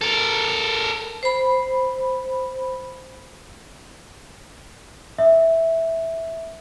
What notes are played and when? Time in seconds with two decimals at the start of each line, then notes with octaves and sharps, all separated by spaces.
0.01 A4 A#4
1.23 C5 B5
5.18 E5